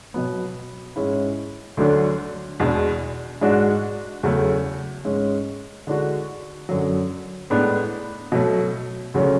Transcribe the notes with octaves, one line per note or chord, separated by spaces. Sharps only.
B2 F#3 B3
G#2 G#3 C#4 E4
D2 D3 F#3 A3 D4
E2 B2 G#3 D4
G#2 G#3 D4 F#4
E2 C#3 F#3 A3 C#4
G#2 G#3 C#4
D3 G#3 D4 F#4
F#2 D3 F#3
A2 G#3 B3 D4
B2 F#3 A3
D2 C#3 F#3 C#4